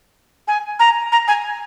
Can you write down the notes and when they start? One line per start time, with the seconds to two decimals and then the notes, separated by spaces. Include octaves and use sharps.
0.48 G#5
0.80 A#5
1.12 A#5
1.28 G#5